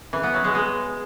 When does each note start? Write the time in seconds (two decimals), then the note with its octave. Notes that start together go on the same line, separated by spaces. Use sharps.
0.13 E3
0.23 B3
0.34 F#3
0.44 G#3
0.55 G#3